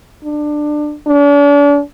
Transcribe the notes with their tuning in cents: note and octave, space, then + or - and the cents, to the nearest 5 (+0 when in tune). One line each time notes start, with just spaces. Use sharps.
D4 +20
D4 -40